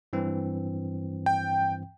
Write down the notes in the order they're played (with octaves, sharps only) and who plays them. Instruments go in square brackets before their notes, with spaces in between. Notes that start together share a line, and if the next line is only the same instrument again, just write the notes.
[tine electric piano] G2 E3 C4
[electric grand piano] G5